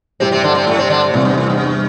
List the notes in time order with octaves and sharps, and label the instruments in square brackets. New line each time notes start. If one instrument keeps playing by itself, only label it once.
[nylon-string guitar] G2 G3 E4 G4 [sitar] C3 C4
[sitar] C3 C4
D3 D4
C3 C4
A2 A3
C3 C4
D3 D4
C3
[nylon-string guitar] E2 C3 G3 [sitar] A2
[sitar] G2
A2
G2